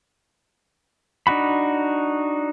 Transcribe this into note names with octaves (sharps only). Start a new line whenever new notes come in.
D4 D#4 F#4 B5